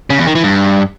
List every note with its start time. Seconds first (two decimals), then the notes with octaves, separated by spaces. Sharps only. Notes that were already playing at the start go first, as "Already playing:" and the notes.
0.10 C#3
0.18 E2
0.27 D#3
0.35 E3
0.44 G2